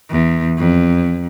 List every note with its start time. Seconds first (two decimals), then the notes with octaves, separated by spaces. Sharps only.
0.10 E2
0.58 F2